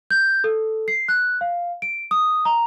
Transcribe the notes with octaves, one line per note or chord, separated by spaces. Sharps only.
G6
A4
C7
F#6
F5
D7
D#6
A#5